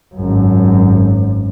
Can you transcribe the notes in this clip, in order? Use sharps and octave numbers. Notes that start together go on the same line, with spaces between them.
G#1 F#2